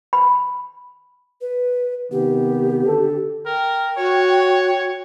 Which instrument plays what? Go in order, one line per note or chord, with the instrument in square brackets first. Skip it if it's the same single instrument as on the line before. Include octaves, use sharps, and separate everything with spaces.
[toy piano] B5
[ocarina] B4
[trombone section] C3 D#3 B3 [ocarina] G4
[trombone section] D3 A4
[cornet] A#4 [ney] G5
[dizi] F#4 [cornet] C#5